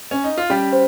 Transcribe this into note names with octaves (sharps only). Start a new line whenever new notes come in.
C#4
D#4
F4
G3 C#4 G4
C5